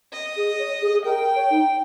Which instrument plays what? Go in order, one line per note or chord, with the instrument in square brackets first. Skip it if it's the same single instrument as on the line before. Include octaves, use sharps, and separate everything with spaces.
[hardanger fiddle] D#5
[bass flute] G#4
C#5
G#4
G#4
[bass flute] A#4 [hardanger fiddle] G5
[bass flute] A#4
C#5
D#4